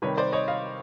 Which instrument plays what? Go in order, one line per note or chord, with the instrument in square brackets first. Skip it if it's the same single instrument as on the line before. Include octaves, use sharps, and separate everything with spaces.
[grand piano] C3 D#3 G3 B4 C#5
C5 D5
C#5 D#5
D#5 F5